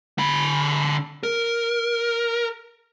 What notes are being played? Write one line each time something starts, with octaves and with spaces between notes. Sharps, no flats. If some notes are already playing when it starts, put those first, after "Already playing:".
D3 B5
A#4